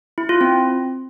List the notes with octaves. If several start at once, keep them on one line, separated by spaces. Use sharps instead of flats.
E4
F4
C4